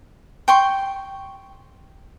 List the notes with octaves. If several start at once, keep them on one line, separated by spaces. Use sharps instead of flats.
G5 C6 C#6